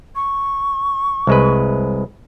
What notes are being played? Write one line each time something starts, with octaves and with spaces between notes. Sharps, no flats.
C#6
C2 G#3 B4